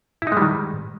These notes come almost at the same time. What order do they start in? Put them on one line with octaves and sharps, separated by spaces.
E4 D#4 G#3 G3 D#3